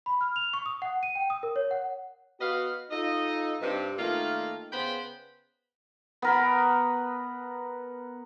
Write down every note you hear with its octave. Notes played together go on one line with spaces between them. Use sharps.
B5
F6
F7
C#6
D#6
F#5
D#7
G5
D#6
A#4
C#5
F#5
B3 F#4 B4 D#5 F5
D#4 F4 A4 D#5
G2 C3
D#3 A3 A#3 F4
C#3 B3 B4 C5 G5 B5
B3 A#4 B5